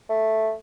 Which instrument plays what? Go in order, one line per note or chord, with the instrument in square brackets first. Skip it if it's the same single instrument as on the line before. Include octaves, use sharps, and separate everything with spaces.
[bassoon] A3